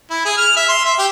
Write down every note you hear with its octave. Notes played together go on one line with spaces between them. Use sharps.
E4
G#4
F6
E5
C6
E5
G4